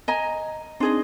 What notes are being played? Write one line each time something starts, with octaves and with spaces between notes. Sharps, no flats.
D#5 G#5 A#5
C4 D4 D#4 G#4 D#5 C6